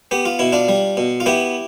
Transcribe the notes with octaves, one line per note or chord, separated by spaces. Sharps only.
B3 G4
F4
B2 E4
D4 F4
G3
B2
F4
B3 E4 G4